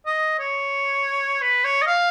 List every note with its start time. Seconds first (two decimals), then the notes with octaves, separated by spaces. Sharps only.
0.06 D#5
0.39 C#5
1.42 B4
1.64 C#5
1.82 D#5
1.87 F5